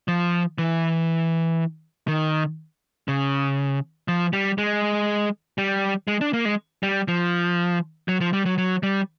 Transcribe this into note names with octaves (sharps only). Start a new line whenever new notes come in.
F3
E3
D#3
C#3
F3
G3
G#3
G3
G#3
D4
A#3
G#3
G3
F3
F#3
F3
G3
F#3
F#3
G3